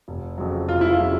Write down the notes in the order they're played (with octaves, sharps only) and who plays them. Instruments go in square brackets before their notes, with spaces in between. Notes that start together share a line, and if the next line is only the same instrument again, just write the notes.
[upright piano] F1
F2 C#3 F#3
F1 F4
E4
F4
C#3 F#3